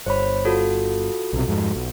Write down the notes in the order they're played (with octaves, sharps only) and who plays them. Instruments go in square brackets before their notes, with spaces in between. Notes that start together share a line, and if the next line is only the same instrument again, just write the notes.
[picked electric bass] G1 [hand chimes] C5 C#5 B5
[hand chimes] F4 F#4 A4
[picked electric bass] B1 C3
F2 G#2
B1